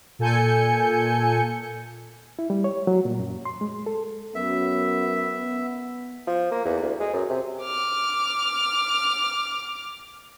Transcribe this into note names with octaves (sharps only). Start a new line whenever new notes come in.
A#2 A4 G#5 G6 C#7
E4
G3
C#5
F#3
A#2
F#2
C6
G#3
A4
F#2 B3 E5
F3
A#3
E2
D2
G#3
F#2
C3
D6 F6